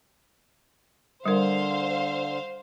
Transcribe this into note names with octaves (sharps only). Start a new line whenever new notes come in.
D3 G3 A#4 C5 F5